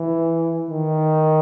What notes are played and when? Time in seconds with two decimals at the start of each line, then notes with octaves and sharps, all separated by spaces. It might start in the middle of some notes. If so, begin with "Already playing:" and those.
Already playing: E3
0.71 D#3